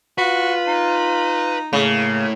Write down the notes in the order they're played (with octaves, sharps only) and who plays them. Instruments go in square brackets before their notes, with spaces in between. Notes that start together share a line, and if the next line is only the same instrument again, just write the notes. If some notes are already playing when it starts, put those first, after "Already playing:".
[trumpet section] F4 [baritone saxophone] F#4 [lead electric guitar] B4
[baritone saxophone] D#4
[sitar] C#3 [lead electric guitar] A3 E4 [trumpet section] A#3